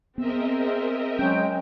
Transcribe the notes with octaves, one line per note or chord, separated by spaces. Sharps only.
B3 C4 G#4 A#4 D#5 E5
F#3 G#3 C#4 G5